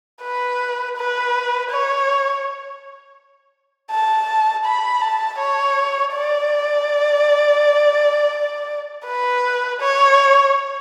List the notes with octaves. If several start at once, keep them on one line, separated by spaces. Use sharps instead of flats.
B4
B4
C#5
A5
B5
A5
C#5
D5
B4
C#5